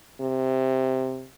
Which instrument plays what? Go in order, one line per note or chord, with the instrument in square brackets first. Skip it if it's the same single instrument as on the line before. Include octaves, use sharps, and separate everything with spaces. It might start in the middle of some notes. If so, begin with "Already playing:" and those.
[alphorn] C3